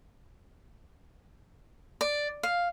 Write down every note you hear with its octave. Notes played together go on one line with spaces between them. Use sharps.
D5
F5